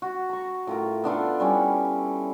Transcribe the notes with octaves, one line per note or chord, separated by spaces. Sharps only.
F#4
A#5 C#6
A2 F4 A#4
B3 D4 F4 A4
G3 C#4 E4 C#5